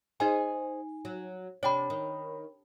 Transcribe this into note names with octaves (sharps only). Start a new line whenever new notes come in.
D#4 G#4 C5 D#5 G#5
F#3
C3 D4 C#5 G5 B5
D#3